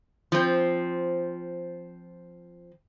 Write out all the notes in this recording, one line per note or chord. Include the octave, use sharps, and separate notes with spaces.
F3 C4